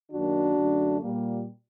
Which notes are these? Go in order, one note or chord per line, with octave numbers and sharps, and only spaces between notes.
F#2 D#3 F#3 A#3 D4 F#4
F#2 D3 A3
A#2 G3 A#3